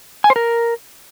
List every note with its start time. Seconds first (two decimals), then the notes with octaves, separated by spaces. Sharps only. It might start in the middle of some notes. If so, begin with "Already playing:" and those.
0.24 G#5
0.30 C5
0.36 A#4